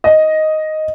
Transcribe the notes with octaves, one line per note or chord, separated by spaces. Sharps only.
D#5